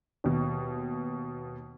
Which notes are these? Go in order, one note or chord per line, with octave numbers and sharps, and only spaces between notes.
D#2 B2